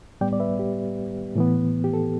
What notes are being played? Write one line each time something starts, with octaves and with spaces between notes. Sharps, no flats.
A2 G3 B3 D5 G5
D5
B4 E5
G4
A2 E3 B3
G4
A4